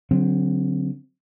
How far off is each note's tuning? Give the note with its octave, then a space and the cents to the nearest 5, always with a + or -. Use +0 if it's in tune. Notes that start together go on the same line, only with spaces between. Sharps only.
D3 -25 F#3 +0 C4 +0